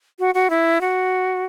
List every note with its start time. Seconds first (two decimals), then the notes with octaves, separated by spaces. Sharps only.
0.19 F#4
0.34 F#4
0.50 E4
0.81 F#4